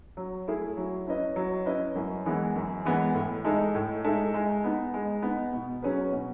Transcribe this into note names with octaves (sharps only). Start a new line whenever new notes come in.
F#3
A3 E4 G#4
F#3
C#4 E4 B4 D#5
F#3
C#4 E4 B4 D#5
F#2
E3 G#3 B3 E4
F#2
E3 G#3 B3 E4
A2
G#3 D#4 A4 E5
A2
G#3 D#4 A4 E5
G#3
B3 D#4
G#3
B3 D#4
B2
F#3 C#4 G#4 B4
B2